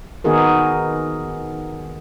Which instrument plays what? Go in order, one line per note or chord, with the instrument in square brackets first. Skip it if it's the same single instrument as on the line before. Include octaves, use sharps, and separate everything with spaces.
[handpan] D#3 B3 D#4 F#4 G#4 A#4